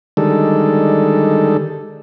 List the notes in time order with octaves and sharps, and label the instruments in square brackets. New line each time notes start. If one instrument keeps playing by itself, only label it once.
[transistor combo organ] D3 D#3 G3 G#3 A4